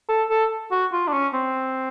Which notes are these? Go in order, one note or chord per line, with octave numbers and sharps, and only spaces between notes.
A4
A4
F#4
F4
D4
C#4
C4